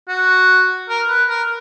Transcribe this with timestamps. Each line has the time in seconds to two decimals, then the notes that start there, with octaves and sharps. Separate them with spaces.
0.08 F#4
0.89 A#4
1.08 B4
1.28 A#4